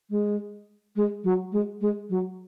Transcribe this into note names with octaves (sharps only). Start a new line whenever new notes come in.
G#3
G#3
F#3
G#3
G#3
F#3